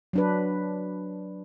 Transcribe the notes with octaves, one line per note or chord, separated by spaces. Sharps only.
F#3 D4 B4